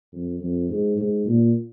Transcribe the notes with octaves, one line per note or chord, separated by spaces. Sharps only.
F2
F2
G#2
G#2
A#2